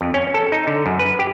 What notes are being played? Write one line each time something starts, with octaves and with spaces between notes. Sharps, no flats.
F2
C#4
A4
D#4
D3
F#2
B4
G4